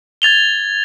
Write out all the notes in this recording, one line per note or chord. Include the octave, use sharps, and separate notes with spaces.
G#6 A6 F7 G7